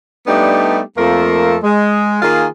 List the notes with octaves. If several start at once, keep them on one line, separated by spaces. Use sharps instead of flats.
G3 A3 B3 D4 D#4 G4
F2 F3 A3 A#3 A4 A#4
G#3
D#3 A#3 F4 G#4